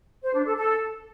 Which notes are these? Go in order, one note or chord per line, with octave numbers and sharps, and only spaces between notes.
C5
D4
A4
A4